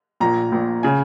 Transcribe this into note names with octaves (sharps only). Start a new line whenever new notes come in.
A#1 A#2 A#5
A#1 A#2
C#3 G#5